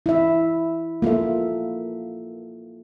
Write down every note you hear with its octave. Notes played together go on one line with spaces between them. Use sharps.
E4 E5
A#3 F4 A4 E5